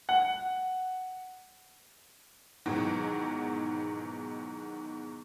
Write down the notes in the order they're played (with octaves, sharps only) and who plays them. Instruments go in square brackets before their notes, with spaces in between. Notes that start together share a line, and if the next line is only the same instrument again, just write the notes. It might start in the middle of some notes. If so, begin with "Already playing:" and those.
[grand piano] F#5
[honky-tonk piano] G#2 B2 D#3 E3 F#3